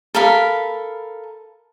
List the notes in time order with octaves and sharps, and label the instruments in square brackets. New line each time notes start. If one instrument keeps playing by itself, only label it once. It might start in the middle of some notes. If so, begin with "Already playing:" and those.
[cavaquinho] A4 A#4 F5 B5